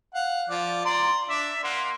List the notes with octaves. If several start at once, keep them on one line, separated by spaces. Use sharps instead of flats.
F5 F#5
F3 D5
D5 A#5 C6
D4 D5 E5
A#3 F#5 C6